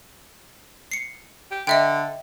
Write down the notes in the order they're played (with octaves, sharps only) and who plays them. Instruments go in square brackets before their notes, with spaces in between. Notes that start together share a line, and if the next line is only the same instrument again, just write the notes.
[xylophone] C7 C#7
[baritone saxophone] G4
[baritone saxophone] D3 [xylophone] D#5 E5 G5